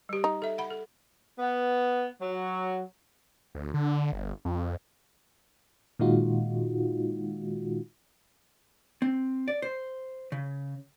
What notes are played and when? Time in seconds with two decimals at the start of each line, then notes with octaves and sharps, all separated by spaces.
0.09 G3 G4
0.24 D#4
0.42 A4 E5
0.58 F#5 B5
0.71 A4
1.39 B3
2.21 F#3
3.55 D2
3.74 D3
4.12 G1
4.45 F2
5.99 A#2 D#3 G#3 D#4 F4 F#4
9.02 C4
9.48 D5
9.62 C5
10.32 C#3